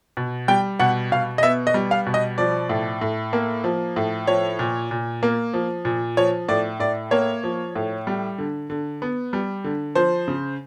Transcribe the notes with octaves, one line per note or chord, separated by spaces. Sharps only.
B2
G3 G5
B2 F#5
B2 F5
D#5
B3 E5
D#5
G3
F5
B2
D#5
F3 D5
A2
A2
A#3
F3
A2
F3 C#5
A#2
A#2
A#3
F3
A#2
F3 C#5
A2 D5
A2 D5
A#3 C#5
F3
A2
G3
D3
D3
B3
G3
D3
F3 C5
C#3